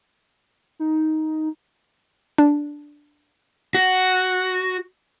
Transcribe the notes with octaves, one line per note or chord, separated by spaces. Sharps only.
D#4
D4
F#4